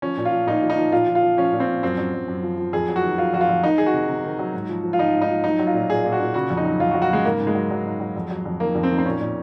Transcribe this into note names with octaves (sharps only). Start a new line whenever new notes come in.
F3 C#4
A#2
F4
F3
A#2 D#4
F3
D#4
F3
A#2 F4
F3
F4
F3
F3 C#4
A#2
C4
F3
F#2 C4
F#2
F#2
F#2
F3
F3
F2 G#4
F#3
F#4
D#3
F#3 F4
F2 F#4
F4
F2
D#3 D#4
D#3 G#4
F#4
C3
C3
D#3
F#3
G#2
F3
F3
F4
F3 D#4
G#2
D#4
F3
F#3 D#4
F#3
F4
A#2
A#2 G#4
A#2
F#4
A#2
C#3 F#4
F2
D#4
F#3
F2 F4
F#4
F#3
F#4
C#3 G#3
G#2 A#3
G#2
G#3
F#3
F#3
G#2
F#3
F2
F#3
F2
D#3 A#3
F2
C4
D#3
C4
A#2 C#4
A#2